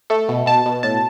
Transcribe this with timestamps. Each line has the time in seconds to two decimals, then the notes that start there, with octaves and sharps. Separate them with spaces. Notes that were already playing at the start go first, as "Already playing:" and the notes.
0.10 A3 A4
0.29 B2
0.46 B2 A5
0.66 B2
0.83 A2 A5